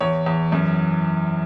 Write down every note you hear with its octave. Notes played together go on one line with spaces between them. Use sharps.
E2 C#5
E2
F#2